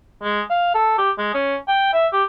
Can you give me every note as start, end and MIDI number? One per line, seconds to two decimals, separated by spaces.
0.23 0.41 56
0.50 0.71 77
0.75 0.96 69
0.98 1.11 67
1.18 1.34 56
1.34 1.56 61
1.68 1.89 79
1.93 2.07 76
2.13 2.24 67